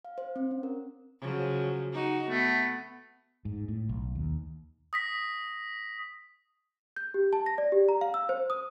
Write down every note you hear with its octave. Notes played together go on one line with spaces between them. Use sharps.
F5
C5
C4
C#4
A#4
C#3 F3 F#3
D#4 F#4
A3 B3
G#2
A2
B1
D#2
D#6 A#6 B6
G6
G4
A5
A#6
D5
G4
A#5
F5
E6
C5
D#6